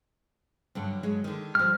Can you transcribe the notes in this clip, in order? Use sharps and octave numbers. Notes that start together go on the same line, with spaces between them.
G2 D3 F#3
F#3 G#3
D3 D#3
F3 G3 F6